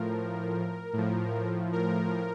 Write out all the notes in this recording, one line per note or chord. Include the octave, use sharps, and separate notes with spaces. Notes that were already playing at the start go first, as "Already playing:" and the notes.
Already playing: A2 F3 A#4
A2 F3
A#4